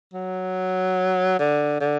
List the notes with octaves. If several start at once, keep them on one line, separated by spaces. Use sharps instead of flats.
F#3
D3
D3